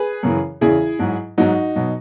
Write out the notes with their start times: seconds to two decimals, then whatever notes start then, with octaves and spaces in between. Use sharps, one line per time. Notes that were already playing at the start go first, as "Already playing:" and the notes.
Already playing: G#4 B4
0.23 F#2 C#3 E3
0.61 E2 C#3 E3 E4 G#4
0.99 G#2 F#3
1.38 G#2 F#3 D#4 F#4
1.76 B2 F#3